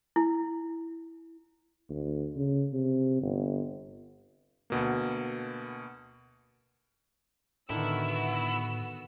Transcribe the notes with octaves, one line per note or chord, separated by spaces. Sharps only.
E4
D2
C#3
C3
G1
D2 B2 A#3
A2 D3 D#3 B3 E4 F#4 E6